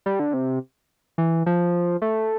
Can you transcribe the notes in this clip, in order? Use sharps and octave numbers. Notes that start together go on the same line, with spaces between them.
G3
D3
C3
E3
F3
A3